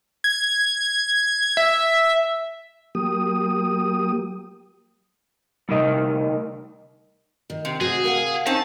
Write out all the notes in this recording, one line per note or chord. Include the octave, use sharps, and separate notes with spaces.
G#6
E5
F#3 A#3 G4 D#6
D2 C3 D#3 G3 D#5
D#3
C3
F#4 G#4 C5 F#5
A#4 F5 F#5
C4 C#4 D#4 A5